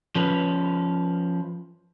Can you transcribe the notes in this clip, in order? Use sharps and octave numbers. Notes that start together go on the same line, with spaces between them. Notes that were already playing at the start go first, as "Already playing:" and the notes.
F3 C#4 B4